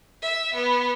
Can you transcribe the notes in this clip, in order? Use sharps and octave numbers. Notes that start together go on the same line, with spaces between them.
E5
B3